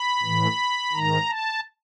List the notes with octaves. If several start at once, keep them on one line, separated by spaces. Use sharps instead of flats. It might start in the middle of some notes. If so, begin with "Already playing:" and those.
Already playing: B5
A2 E3
G#2 D#3 A#5
A5